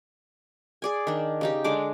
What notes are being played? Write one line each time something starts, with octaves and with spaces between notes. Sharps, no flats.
G#4 D5 G#5
D#3 D4
C#3 D#4 G4
D3 G#3 D4 D6